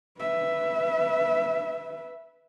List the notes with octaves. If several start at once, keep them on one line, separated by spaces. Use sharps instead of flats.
B4 E5